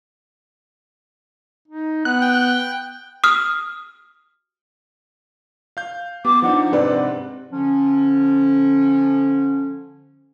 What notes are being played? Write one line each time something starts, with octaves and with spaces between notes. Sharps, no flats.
D#4
B3 F#6
G5
D#6 F6
F5 G6
B3 G4 D6
F3 D4 D#4 F#5
G#2 C3 C4 D4 B4 D5
D3 F3 C#4